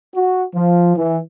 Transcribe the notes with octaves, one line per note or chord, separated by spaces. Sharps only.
F#4
F3
E3